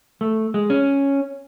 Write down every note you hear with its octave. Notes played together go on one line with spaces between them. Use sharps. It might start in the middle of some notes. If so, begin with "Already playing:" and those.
A3
G#3
C#4